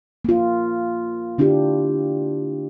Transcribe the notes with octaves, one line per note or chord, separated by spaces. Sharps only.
A#3 F4
D3 D4 E4 F4 G4